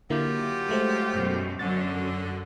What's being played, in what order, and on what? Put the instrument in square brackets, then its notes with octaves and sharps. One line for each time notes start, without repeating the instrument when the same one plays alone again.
[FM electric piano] D3 A#3 E4 [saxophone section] F#3 F4 G4
[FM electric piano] G#3 A3 C5
[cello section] F#2 B2
[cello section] F#2 [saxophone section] D3 [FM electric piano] A6